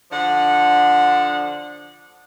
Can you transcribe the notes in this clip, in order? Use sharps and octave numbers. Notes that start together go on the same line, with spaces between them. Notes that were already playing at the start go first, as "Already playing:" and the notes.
D3 F3 D4 F#5